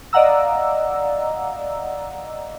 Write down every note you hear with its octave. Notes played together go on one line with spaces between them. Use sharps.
D5 D#5 F5 F#5 A#5 E6